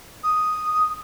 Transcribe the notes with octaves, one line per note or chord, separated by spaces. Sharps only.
D#6